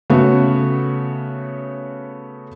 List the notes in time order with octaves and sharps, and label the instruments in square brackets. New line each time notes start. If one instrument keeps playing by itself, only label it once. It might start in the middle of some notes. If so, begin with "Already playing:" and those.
[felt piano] C#3 A3 B3 F#4